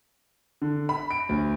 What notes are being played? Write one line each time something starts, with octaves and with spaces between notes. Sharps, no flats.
D3
B5
D7
D2